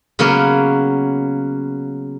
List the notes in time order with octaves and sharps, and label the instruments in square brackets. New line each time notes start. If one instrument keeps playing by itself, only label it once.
[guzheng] C#3 F#3 A#3 B3